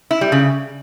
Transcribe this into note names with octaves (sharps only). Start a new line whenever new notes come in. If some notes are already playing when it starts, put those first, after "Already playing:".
E4
G3
C#3